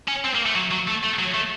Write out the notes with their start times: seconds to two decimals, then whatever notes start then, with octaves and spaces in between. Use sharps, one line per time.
0.08 C#4
0.25 C4
0.35 A#3
0.46 A3
0.55 F#3
0.71 F#3
0.88 A3
1.03 A3
1.19 F#3
1.34 A3